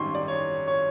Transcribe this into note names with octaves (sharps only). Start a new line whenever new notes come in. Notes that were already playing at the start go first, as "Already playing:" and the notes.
Already playing: G#1 F#2 D#3 G3 C6 C#6
D5
C#5
C#5